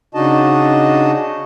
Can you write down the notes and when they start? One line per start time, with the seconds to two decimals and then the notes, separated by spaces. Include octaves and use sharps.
0.14 C#3 D4 D#4 F#4 D#5 A5